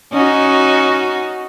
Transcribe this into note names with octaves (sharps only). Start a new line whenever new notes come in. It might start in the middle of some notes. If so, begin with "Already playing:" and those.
C#4 D#4 F#4